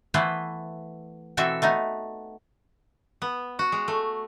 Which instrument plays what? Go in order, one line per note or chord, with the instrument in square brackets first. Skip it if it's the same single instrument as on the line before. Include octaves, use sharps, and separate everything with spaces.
[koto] E3 A3 B3 E4 B4 C5
B2 E3 C4 F#4 A4 E5
A3 B3 D#4
B3
F#4
G#3
A3